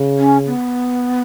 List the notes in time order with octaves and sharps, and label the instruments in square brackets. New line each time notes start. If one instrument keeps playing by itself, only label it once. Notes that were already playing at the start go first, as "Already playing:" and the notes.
Already playing: [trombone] C#3
[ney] C#4
B3